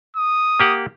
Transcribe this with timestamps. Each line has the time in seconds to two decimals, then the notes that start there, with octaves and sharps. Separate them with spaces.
0.16 D#6
0.60 A#3 G4 F#5